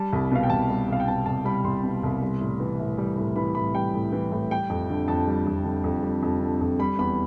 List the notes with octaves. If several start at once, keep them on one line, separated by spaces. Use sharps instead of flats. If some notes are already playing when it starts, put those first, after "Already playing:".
Already playing: G3 A5
C2
B2 F5
G5
C2 A5
G3
C2 F5
G5
B2 A5
C2 A5
G3 B5
C2 C6
B2
C2
G3
A2
E3
A2
G3
A2
E3 B5
A2 B5
G3 G5
A2
E3
A2
G3 G5
F2
D3
F2 A5
G3
F2
D3
F2
G3
F2
D3
F2
G3 B5
E2 B5